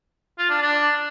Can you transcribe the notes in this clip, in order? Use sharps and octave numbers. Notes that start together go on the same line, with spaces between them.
F4
D4
D4